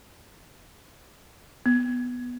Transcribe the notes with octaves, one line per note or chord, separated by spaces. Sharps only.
B3